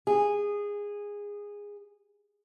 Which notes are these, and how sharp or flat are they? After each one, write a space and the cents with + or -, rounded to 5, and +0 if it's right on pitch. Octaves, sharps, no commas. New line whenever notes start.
G#4 -15